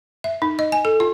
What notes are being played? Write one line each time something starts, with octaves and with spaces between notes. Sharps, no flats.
E5
D#4
D#5
G#5
A4
F4